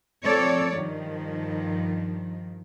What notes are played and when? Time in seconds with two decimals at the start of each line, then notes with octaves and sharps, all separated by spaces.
0.24 F3 C4 A4 C#5 D5
0.72 G2 D#3 F3